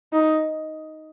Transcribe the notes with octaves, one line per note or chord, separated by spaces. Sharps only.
D#4